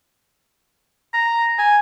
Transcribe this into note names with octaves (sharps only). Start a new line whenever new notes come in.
A#5
G#5